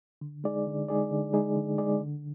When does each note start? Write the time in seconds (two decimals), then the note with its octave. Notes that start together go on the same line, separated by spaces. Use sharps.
0.21 D3
0.44 G#3 D#4 G#4 D5
0.67 D3
0.88 G#3 D#4 G#4 D5
1.11 D3
1.33 G#3 D#4 G#4 D5
1.56 D3
1.78 G#3 D#4 G#4 D5
2.00 D3